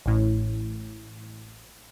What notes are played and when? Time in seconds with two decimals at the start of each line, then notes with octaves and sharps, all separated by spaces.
0.06 A1 A2